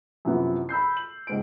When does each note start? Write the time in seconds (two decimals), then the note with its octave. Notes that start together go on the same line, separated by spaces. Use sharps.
0.25 F#2 C3 E3 F3 B3
0.69 B5 E6 G6 C7
0.97 F#7
1.27 C#2 G#2 D7